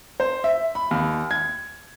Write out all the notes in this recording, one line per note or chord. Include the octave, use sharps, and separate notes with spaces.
C5
E5
B5
D#2
G#6